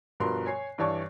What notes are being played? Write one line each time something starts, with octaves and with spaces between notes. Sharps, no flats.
G2 B2 F3 A#4 B4 C6
C#5 G#5 C7
G2 E3 C#5 D5 A5 C#6